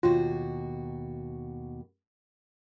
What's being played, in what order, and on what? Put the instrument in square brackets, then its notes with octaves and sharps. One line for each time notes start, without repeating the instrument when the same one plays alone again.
[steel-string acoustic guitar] D#2 B2 F#4 [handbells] F4